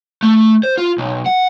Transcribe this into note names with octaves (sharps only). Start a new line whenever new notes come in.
A3
C5
F4
B1
F#5